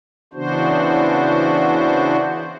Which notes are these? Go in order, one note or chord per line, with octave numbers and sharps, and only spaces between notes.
C#3 E3 B3 D4 F#4 C5